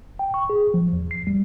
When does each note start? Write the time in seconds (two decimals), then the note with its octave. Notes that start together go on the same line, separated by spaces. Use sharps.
0.19 G5
0.34 C#6
0.50 G#4
0.74 F3
0.93 E2
1.11 C7
1.27 G3